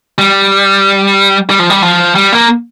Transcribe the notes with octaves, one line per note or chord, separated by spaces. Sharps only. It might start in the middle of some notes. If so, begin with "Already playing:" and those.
G3
G3
F3
G3
F3
G3
A#3